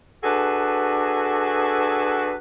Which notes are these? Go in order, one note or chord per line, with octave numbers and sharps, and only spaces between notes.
D4 F#4 G#4 A4 B4